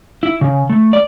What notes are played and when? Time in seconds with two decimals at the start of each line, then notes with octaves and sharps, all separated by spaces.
0.23 E4
0.41 C#3
0.70 A3
0.93 D5